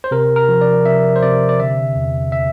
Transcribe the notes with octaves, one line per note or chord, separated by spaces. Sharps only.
C5
C3 A#4
A#4
F3
D5
C3 E5
C5
C3 D5
D5
D3 E5
E2
E5